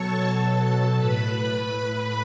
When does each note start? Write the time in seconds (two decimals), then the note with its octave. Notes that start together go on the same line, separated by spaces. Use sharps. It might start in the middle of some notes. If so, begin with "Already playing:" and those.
Already playing: B2 F#3 A4 C#5 A5 C#6
0.25 B2 F#3
0.61 A4 A5
0.96 A2 B4 B5